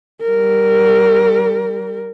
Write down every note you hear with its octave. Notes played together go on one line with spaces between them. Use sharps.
G3 A#4